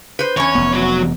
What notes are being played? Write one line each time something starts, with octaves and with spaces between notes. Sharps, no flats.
B4 C5
E2 C#4 C#5
F1 B3
F#3 C#5